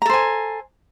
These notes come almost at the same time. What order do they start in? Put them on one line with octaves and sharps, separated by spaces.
A#5 A4 C5 G#5